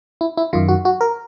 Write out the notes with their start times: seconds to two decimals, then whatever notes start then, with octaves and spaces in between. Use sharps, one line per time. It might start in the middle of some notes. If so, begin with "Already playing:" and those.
0.21 E4
0.37 E4
0.53 F#2 D#3 F4
0.68 F#4
0.85 F#4
1.01 A#4